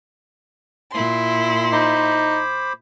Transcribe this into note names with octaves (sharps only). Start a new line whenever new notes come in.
A#2 E4 C6
D#4 C5 B5 D6